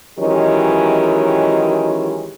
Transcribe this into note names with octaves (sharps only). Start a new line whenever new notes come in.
D#3 E3 F#3 G#3 C#4 G4